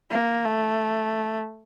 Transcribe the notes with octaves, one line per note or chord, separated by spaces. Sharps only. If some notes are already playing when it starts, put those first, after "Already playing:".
A#3
A3